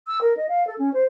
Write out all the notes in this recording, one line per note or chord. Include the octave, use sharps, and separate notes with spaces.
E6
A#4
D#5
F5
A4
C#4
C5